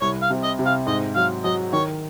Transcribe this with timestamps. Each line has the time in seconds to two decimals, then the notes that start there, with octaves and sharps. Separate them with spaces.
0.01 C2 C#5
0.22 F5
0.30 C3
0.44 D#5
0.59 C3
0.66 F5
0.87 G#2 D#5
1.16 F#3 F5
1.44 F#3 D#5
1.73 D#3 C#5